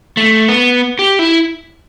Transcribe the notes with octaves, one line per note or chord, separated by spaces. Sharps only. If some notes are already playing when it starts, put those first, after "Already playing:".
A3
B3
G4
E4